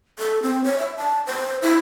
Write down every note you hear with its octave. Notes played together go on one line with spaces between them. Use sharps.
A4
C4
C#5
E5
A5
C5
E4